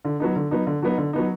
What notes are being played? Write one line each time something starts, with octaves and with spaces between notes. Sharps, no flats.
D3
F#3 B3 D#4
D3
F#3 B3 D#4
D3
F#3 B3 D#4
D3
F#3 B3 D#4